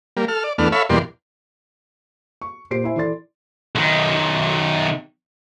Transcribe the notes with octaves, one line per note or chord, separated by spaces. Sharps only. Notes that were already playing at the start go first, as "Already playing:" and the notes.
G3 A#3
A4 F6
D5
E2 A3 B3 D4 F6
A4 C#5 E5 F5 B5
E2 B2 G3 A#3 D5 C6
C#6
A#2 G4 C5 C7 D7
E4 C5 E5 G#5
E3 A4 D5 C6 A6
B1 D#3